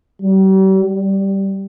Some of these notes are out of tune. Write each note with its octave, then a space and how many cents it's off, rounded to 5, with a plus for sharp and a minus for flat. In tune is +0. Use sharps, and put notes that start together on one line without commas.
G3 -40
G3 -5